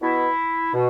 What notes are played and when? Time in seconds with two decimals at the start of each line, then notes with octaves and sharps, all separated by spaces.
0.02 B2 E4
0.73 B2